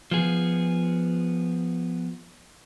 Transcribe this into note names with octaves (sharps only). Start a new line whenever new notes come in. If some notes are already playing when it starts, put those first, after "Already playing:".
F3 B3 G#4